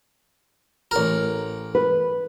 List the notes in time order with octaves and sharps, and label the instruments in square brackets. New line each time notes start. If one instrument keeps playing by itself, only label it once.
[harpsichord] A1 A#4
[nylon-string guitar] B4